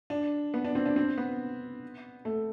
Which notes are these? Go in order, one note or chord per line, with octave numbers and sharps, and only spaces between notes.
D4
B3
D4
C4
D4
C4
B3
A3